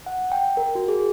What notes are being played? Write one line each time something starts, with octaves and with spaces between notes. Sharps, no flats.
F#5
G5
A#4
F#4
G#4